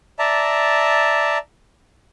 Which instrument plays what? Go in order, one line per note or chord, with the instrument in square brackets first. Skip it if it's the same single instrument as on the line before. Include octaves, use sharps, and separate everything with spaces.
[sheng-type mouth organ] D5 E5 A5 A#5